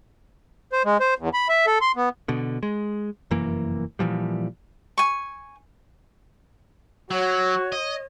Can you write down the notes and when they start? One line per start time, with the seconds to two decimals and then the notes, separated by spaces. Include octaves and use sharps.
0.73 C5
0.85 G#3
1.00 C5
1.19 E2
1.34 B5
1.49 E5
1.67 A4
1.81 C6
1.96 B3
2.28 B2 D3
2.63 G#3
3.31 F1 F#2 E3 A#3
3.99 A#2 E3 F3 G3
4.98 G#5 C#6
7.11 F#3 F#4 C#5
7.72 D#5